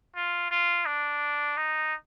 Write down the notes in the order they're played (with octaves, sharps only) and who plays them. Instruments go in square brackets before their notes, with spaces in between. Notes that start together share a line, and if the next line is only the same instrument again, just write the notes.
[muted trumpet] F4
F4
D4
D#4